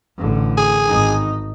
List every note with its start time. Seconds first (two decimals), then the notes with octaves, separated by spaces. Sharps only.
0.18 A1 D3
0.58 G#4
0.87 G#1 D#4